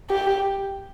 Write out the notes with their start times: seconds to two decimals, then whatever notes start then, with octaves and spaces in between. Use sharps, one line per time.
0.10 G4